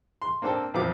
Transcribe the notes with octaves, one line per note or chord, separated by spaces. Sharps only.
C6
A#3 C4 D4 A4 G5
A1 F2 A#2 F3 F#3 D6